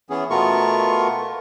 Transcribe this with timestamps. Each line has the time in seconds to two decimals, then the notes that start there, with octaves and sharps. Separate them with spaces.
0.10 E3 B3 C#4 G#4
0.30 B2 A3 B3 F4 A#4 C#6